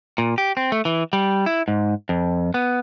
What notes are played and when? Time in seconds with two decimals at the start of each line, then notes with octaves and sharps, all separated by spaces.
0.18 A#2
0.38 G4
0.57 C4
0.72 A3
0.85 E3
1.13 G3
1.46 E4
1.68 G#2
2.09 F2
2.54 B3